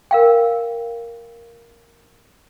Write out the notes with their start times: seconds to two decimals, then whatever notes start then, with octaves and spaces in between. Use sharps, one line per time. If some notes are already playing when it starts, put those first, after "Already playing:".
0.11 A#4 F5 G5